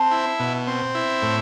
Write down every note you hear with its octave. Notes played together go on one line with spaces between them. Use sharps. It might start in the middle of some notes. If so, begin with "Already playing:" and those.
Already playing: C4 A5
E4
B2
C4
E4
A2